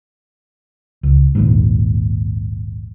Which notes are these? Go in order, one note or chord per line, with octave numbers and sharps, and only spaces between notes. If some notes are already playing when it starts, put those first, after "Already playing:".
C#2
A#1 D#2 G#2